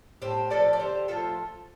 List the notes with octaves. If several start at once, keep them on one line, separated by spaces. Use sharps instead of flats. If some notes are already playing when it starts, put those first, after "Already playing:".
A2 G4 C5
F3 A3 A4 D5
D5
D3 G4 C5
F3 A3 F4 A4